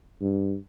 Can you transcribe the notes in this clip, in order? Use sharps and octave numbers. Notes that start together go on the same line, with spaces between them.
G2